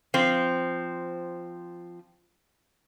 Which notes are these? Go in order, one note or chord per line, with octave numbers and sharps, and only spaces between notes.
F3 C4